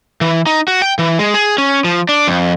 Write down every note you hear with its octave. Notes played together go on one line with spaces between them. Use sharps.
E3
D#4
F#4
G5
E3
G#3
G#4
C#4
F3
D4
F2